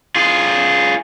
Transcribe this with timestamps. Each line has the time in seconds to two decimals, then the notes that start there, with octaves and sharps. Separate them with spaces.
0.16 F4 G#4